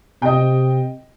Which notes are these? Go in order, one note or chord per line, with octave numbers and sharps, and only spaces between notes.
C3 D#5 G5